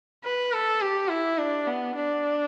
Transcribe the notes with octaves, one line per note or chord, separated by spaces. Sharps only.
B4
A4
G4
E4
D4
B3
D4